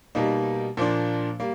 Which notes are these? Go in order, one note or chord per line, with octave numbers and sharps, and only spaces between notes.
B2 G3 A#3 D#4
A#2 F3 A#3 D4
G3 A#3